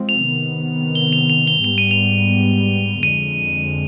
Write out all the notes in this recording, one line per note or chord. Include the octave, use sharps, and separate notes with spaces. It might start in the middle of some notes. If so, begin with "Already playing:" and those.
Already playing: F3 G#3 C4
F7
C3 D#3 B3
G7
F7
F7
G7
G#2 G3 B3 F7
D#7
F7
F2 D3 G#3 D#7